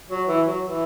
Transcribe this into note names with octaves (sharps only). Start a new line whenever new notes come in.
F#3
E3
F#3
E3